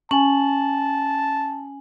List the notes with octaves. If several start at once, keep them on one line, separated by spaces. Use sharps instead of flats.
C#4 G#5 A5 F#7